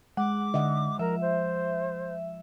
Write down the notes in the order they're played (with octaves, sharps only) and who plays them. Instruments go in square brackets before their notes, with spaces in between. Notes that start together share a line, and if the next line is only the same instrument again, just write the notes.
[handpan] G#3 [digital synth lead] F#5 [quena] D6
[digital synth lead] D3 [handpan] D#5 E5 F#5
[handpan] F3 [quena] A#4 [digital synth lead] E5
[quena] C5